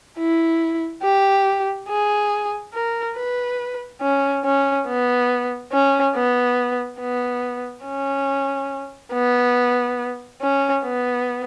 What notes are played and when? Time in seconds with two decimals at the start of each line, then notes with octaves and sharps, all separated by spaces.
0.18 E4
1.03 G4
1.89 G#4
2.74 A#4
3.16 B4
4.02 C#4
4.45 C#4
4.87 B3
5.72 C#4
6.15 B3
7.01 B3
7.86 C#4
9.13 B3
10.41 C#4
10.84 B3